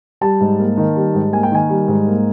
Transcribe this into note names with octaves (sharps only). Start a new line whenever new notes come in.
G3 A5
G#2
A#3
D#3
G3
G#2
A#3 G#5
G5
D#3 G#5
G3
G#2
A#3